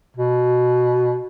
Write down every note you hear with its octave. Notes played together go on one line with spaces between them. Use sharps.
B2